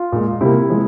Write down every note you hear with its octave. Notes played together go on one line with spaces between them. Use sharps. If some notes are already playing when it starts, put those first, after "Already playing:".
Already playing: F4
A#2 G#3
C3 G3 A#3 E4
F3 G#3